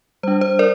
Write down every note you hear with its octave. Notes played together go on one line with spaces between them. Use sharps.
G3 D4 C5
C5
A#4 D5